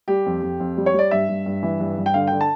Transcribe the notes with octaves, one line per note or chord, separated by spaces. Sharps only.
G3 G4
F2
F2
F2
G3
C#5
G3
D5
G2 E5
G2
G2
E3
G2
G2
G5
D3 F5
D3 G5
A5